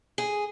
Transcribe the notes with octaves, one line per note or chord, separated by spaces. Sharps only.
G#4